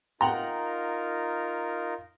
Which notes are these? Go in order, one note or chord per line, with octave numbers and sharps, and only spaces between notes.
D#4 F4 A#4 F#5 G5 A#5